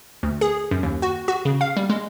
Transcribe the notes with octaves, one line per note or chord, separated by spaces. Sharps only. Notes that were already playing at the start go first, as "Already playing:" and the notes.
D2
G#4
F#2
D#2
F#4
F#4
C#3
F5
G3
G#3